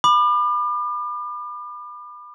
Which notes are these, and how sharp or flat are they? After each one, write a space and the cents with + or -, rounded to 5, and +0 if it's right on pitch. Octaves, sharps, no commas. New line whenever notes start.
B5 +0 D6 +40